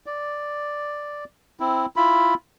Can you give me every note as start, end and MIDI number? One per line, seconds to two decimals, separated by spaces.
0.06 1.24 74
1.60 1.86 60
1.60 1.86 64
1.96 2.34 64
1.96 2.34 65
1.96 2.34 83